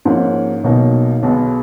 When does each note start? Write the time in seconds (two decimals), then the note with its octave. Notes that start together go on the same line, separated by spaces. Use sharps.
0.05 G#2 F3 A#3 C#4
0.64 B1 B2 F#3 A#3 D#4
1.23 B1 B2 G#3 B3